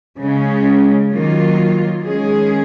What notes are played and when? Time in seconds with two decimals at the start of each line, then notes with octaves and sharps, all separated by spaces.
0.19 C#3 G#3 C#4
1.12 D#3 F#3 A#3 F4
2.05 D#3 G#3 C#4 G#4